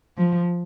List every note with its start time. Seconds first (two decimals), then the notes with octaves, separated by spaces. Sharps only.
0.17 F3